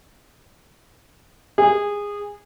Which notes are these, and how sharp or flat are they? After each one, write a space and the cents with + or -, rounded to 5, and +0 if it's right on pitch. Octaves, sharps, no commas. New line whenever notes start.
G#4 -20